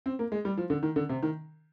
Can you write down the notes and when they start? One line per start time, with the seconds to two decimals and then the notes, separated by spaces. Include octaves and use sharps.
0.06 C4
0.19 A#3
0.32 G#3
0.45 G3
0.57 F3
0.70 D3
0.83 D#3
0.96 D3
1.09 C3
1.22 D#3